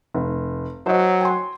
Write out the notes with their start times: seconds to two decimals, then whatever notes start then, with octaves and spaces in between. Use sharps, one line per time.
0.14 F1
0.86 F#3 C5 D#5
1.21 G5 G#5 C6